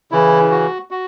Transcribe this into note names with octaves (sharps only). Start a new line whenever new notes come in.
C#3 E3 E4
F#4
F#4